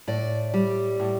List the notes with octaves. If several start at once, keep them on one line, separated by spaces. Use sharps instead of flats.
A2 D5
G3
A2